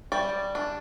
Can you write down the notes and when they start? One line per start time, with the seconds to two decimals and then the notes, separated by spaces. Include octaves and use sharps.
0.12 G3 D5
0.55 D4